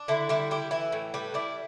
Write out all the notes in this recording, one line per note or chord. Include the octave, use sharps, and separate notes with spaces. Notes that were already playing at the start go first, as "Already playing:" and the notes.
Already playing: D4
D3 E4
G3 E4
E4 G4
E3 E4
A2
G3 B4
E4 D5